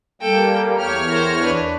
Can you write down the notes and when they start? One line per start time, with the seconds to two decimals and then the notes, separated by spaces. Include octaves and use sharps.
0.22 G3 A#3 A4 G5
0.77 E2 G4 C#5 F6
1.09 A#4 C5
1.41 D4 B4